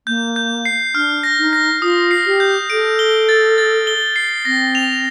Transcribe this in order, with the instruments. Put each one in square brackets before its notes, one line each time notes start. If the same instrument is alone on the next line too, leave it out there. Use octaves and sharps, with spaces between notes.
[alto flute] A#3 [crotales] G6
[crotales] G6
C7
[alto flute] D4 [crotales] F6
[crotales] A#6
[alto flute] D#4
[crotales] A#6
[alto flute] F4 [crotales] D#6
[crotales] C7
[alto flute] G4
[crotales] G6
[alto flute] A4 [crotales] D7
[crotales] G7
A6
A6
G7
C7
[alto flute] C4 [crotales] A#6
[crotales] F7